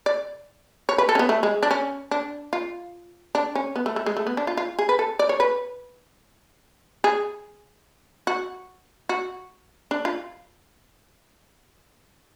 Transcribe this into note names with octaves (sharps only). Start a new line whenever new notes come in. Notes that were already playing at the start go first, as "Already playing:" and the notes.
D5
C#5
B4
A4
C#4
B3
A3
G#3
D4
C#4
D4
F4
D4
C#4
B3
A3
A3
G#3
A3
B3
D4
F4
F4
G#4
B4
A4
D5
C#5
B4
G#4
F#4
F#4
D4
F4